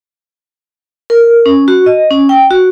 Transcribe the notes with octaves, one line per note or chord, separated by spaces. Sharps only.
A#4
C#4
F#4
D#5
C#4
G5
F#4